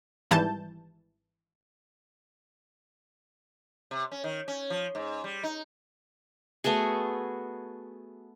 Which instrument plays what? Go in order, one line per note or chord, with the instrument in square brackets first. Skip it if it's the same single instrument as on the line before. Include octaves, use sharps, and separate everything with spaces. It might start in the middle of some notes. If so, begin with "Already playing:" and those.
[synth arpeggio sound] G#1 E3 G3 A5 G6
[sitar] C3
C#4
D#3
C#4
F3
G#2
G3
D#4
[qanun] A3 B3 F#4 G#4